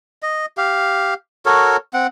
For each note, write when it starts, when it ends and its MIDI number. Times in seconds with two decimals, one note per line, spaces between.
0.23 0.46 75
0.57 1.14 67
0.57 1.14 77
1.46 1.77 66
1.46 1.77 69
1.46 1.77 70
1.46 1.77 73
1.94 2.07 60
1.94 2.07 78